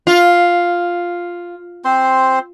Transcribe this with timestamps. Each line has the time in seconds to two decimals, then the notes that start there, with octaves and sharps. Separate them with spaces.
0.07 F4
1.85 C4 C5 C6